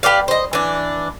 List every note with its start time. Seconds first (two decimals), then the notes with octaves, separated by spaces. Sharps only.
0.03 G4 B4 D5 F5
0.28 C5 D#5
0.53 E3 D4